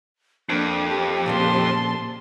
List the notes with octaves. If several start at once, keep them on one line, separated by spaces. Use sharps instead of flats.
F2 A#3 D4
G4
A#2 C#3 A#3 A5 C6